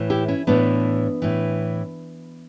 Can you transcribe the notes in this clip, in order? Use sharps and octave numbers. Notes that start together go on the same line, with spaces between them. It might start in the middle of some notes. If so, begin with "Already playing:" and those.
Already playing: A2 E3
E4 G4
C#4 E4
A2 E3 B3 D4
A2 E3